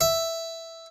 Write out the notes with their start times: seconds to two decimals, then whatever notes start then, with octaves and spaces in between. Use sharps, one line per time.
0.01 E5